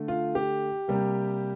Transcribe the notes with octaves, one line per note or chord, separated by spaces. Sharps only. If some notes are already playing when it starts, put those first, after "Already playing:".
Already playing: D3 A3
F4
G4
C3 G3 A#3